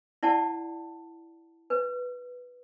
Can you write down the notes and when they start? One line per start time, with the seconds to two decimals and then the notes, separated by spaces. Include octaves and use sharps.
0.23 E4 D5 F#5 A5
1.70 B4